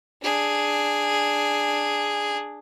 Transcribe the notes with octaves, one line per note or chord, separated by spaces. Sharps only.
D4 G#4